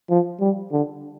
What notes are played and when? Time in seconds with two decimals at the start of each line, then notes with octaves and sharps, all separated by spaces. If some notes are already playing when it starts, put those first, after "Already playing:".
0.10 F3
0.41 G3
0.72 D3